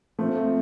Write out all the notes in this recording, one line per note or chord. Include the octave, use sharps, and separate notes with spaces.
F3 A3 C4